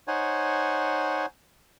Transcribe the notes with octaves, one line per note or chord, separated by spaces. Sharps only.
D#4 C5 C#5 F#5 G#5